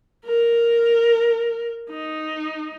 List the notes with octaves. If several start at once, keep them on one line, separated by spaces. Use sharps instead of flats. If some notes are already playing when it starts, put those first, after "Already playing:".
A#4
D#4